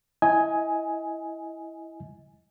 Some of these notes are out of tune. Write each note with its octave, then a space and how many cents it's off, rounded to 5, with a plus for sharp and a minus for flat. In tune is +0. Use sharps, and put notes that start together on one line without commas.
E4 +0 D#5 +25 G#5 +0